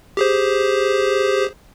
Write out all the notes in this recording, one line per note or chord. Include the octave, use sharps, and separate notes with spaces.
G4 G#4 C5